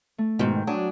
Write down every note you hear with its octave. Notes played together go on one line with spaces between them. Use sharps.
A3
G#2 B2 D#3 G5
F#3 D4 G#5 D6 D#6